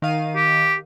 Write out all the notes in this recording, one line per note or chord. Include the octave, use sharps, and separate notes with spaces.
D#3 F5 D#7
G4